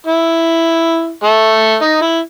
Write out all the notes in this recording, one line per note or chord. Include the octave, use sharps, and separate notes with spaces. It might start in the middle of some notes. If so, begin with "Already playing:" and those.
E4
A3
D#4
E4